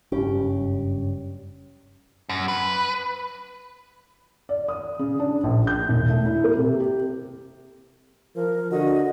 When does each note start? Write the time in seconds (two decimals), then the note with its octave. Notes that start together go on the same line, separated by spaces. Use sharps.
0.12 F#1 G2 C#4 G4
2.29 F#2
2.48 B4
4.49 D5
4.68 D#6
4.99 C#3
5.20 D4
5.44 A#1
5.67 G6
5.89 E1
6.10 A3
6.26 E4
6.44 A#3
6.57 C3
6.80 G4
8.36 F3 A#4
8.71 D3 F#4 D#5